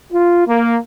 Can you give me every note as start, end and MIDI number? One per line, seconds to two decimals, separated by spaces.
0.12 0.42 65
0.47 0.76 58